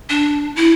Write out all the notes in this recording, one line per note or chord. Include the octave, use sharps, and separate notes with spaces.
D4
E4